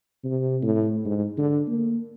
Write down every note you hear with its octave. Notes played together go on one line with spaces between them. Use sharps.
C3
A2
G#2
D3
A#3